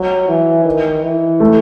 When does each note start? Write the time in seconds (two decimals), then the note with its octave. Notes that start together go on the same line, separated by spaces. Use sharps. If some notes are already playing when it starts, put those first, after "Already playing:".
Already playing: F#3
0.28 E3
0.65 D#3
1.03 E3
1.40 A3